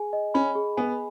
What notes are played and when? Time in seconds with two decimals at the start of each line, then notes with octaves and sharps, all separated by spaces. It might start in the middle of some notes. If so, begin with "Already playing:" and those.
Already playing: G#4 G#5
0.13 D#5
0.34 C#4 B5
0.55 G#4
0.77 B3 G#5